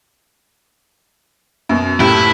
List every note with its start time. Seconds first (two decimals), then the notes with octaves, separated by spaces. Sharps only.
1.69 F#2 B2
2.00 F#1 A2 E4 G4